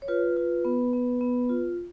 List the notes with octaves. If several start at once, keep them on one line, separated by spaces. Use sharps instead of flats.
C#5
F4 B4
F4
B3
B3
B3
F4